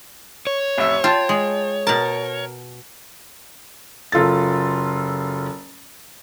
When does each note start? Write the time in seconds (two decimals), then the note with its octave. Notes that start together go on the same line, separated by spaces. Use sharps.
0.47 C#5
0.78 A1 F2 E5
1.04 F4 G5 A5
1.29 G#3
1.87 B2 A#4 A5
4.12 F#1 F4 A4 A6